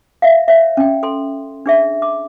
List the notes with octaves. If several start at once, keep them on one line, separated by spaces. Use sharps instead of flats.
E5 F5
C#5 E5
C#4 G5
A4 C6
D4 G#4 E5
D6